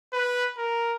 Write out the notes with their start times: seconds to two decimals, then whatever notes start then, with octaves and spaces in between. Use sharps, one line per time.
0.13 B4
0.58 A#4